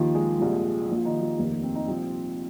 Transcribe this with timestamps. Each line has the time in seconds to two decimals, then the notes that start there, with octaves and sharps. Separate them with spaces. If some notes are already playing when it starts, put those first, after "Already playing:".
Already playing: D#2 D#3 F3 F4
0.14 G#3 G#4
0.39 C2 A#2 F3
0.89 A#1 A#2 F3
0.97 F4
1.05 D#3 D#4
1.21 F3 F4
1.39 F1 D#2 D#3 A#3
1.63 C4
1.75 D#4
1.87 C2 A#2 F3 C4